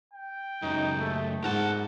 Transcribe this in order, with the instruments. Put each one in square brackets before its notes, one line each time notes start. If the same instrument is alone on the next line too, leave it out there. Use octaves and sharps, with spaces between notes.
[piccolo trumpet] G5
[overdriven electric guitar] C#2 F#2 [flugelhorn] D#4
[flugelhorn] A3
[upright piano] G#2 [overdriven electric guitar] A#4 A5 [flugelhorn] F#5